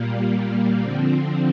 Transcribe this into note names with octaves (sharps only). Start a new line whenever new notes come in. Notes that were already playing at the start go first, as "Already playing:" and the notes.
Already playing: A#2 G3 A#3
D3 F3 C4